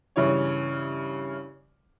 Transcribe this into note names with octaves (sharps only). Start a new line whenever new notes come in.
G2 C#3 E3 E4 C#5